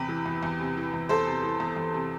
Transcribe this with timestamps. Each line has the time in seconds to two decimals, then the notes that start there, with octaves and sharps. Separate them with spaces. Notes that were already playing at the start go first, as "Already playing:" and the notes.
Already playing: E2 C3 G4 B4
0.09 E3
0.26 E2
0.43 E2
0.60 C3
0.77 E3
0.93 E2
1.09 E2 A4 C5
1.27 C3
1.43 E3
1.60 E2
1.76 E2
1.94 C3